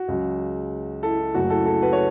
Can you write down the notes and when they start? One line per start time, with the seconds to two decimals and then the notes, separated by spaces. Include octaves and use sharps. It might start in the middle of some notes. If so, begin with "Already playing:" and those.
Already playing: F#4
0.08 C#2 C#3 F#3
1.03 E4 A4
1.19 E4
1.34 F#1 F#2 C#3 A3 F#4
1.50 E4 A4
1.66 E4 A4
1.82 F#4 B4
1.93 C#5